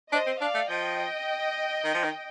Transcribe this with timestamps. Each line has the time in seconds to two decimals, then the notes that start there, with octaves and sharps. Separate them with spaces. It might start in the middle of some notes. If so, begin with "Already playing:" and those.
0.12 D4 C5 D#5
0.27 C4
0.40 D4 D5 F5
0.55 A3
0.70 F3 D#5 G5
1.85 D#3
1.95 F3
2.04 D#3